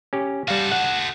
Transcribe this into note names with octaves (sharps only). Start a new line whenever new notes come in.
C#4 G4
G3 F#4 A4 F5
F#5